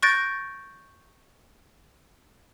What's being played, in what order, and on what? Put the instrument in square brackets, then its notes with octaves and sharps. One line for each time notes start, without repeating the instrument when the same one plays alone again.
[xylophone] C#6 F#6 G6 A6 A#6 D7